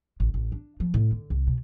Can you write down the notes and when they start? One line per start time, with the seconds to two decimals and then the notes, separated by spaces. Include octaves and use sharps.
0.20 A1
0.34 A1
0.52 D4
0.80 F3
0.94 A2
1.12 D3
1.30 C2
1.47 B2